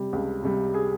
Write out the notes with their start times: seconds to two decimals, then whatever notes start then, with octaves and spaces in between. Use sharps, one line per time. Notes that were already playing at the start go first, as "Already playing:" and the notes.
Already playing: C3 G3
0.13 C#2
0.43 C3 G3
0.74 G#4